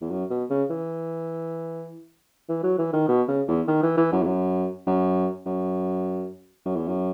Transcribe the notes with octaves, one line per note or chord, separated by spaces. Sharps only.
E2
F#2
B2
C#3
E3
E3
F#3
E3
D#3
B2
C#3
E2
D#3
E3
E3
F#2
E2
F#2
F#2
F#2
F#2
E2
F#2